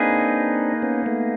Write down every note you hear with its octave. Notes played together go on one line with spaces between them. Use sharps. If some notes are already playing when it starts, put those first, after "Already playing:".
Already playing: A#3 C4 D4 D#4 G#4 B4
B3 C#4
A3 B3